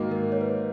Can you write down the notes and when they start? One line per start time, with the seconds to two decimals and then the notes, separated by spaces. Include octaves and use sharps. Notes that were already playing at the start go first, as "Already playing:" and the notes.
Already playing: G#2 D#3 A#3 F#4
0.11 A#4
0.32 C#5
0.41 B4